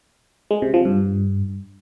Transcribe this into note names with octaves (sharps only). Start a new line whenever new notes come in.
G#3
C3
F3
G2